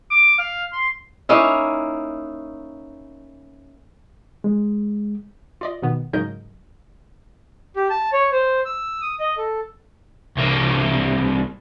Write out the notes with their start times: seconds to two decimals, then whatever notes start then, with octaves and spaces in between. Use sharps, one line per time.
0.11 D6
0.39 F5
0.73 C6
1.29 A#3 C#4 D#4 E4
4.44 G#3
5.61 F4 D5 D#5
5.82 B2 D#3 B3
6.13 G#2 C#3 F#3 A#4 D#5 G6
7.76 G4
7.90 A5
8.13 C#5
8.32 C5
8.65 E6
9.01 D#6
9.20 D#5
9.37 A4
10.37 C2 A#3